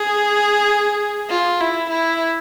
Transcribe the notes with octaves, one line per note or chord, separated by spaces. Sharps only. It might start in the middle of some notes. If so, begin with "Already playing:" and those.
Already playing: G#4
F4
E4
E4